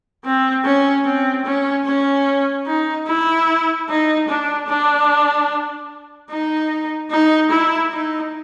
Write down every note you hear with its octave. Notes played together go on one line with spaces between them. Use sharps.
C4
C#4
C4
C#4
C#4
D#4
E4
D#4
D4
D4
D#4
D#4
E4
D#4